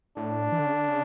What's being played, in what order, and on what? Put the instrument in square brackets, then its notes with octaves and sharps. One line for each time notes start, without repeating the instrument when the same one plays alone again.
[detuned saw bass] A2 [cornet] D4
[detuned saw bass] E3
D3
C#3
D3
C#3